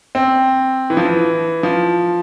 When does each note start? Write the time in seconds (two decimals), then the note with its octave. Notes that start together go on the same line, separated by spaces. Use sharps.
0.15 C4
0.90 E3
0.97 F3
1.05 E3
1.63 F3